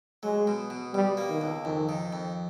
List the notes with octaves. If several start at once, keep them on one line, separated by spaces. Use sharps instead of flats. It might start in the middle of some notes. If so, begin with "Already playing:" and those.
F#3 G#3
B2
B2
B2 G3
A#3
D#3
C#2
F2 D#3
D#3
F2